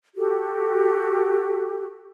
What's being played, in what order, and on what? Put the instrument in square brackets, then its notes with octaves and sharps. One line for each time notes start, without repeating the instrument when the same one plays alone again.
[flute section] F#4 G4 A4